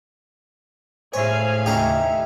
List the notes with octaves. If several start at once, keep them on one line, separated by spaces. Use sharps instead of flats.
A2 G#4 C5 C#5 E5 F5 G#5
D#2 C#3 A3 C#4 D#4 G4 E5